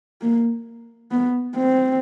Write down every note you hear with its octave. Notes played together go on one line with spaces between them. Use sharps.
A#3
B3
C4